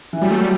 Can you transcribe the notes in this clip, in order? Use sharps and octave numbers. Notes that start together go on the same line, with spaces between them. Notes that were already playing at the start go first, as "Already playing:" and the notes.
E3
F#3 G3
A3
G3